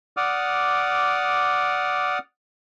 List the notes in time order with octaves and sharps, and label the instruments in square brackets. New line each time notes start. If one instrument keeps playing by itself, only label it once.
[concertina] D5 F#5 D6 D#6 F6